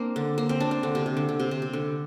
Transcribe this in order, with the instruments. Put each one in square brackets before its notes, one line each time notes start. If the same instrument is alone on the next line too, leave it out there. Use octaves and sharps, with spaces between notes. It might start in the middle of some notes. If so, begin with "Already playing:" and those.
Already playing: [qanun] A#3 C4 D4
D3
A#3
C4
D4
C4
D3
C3
C3
D3
D3
C3
C3
C3
D3